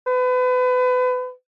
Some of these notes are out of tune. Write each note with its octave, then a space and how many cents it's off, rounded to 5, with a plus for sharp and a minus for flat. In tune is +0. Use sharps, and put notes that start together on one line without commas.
B4 +30